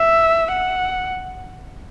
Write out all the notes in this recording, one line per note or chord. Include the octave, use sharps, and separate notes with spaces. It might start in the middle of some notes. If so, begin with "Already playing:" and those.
Already playing: E5
F#5